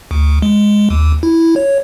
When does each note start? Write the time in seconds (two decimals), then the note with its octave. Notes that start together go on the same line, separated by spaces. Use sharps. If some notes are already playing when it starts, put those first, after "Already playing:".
0.11 D2
0.42 G#3
0.90 D#2
1.23 E4
1.40 E4
1.56 C#5